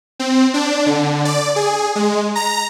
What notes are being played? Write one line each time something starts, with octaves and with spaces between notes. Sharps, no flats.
C4
D4
D3
D5
G#4
G#3
A#5